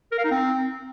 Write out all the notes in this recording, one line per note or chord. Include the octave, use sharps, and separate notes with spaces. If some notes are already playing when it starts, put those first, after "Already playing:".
A#4
F5
D#4
C4